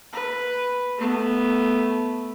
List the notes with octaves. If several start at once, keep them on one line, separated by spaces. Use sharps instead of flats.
B4
A3 B3